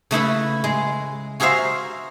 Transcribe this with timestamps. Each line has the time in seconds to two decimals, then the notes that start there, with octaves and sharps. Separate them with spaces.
0.11 C#3 A3 E4 B4
0.64 G#3
1.40 F#4 G#4 A#4 C5 E5 F5